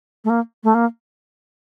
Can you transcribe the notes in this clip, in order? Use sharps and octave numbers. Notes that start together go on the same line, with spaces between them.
A3
A#3
A3
A#3